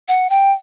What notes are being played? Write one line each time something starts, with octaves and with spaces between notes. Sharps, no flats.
F#5
G5